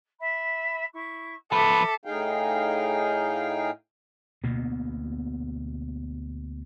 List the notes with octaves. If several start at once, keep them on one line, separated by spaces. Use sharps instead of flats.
E5 B5
E4 C#6
F3 A4 B4 E5 D6
A2 D#4 G#4 F5 G5
D2 B2 A#3 B3